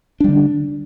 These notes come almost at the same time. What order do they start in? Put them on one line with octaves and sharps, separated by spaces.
D4 G3 D3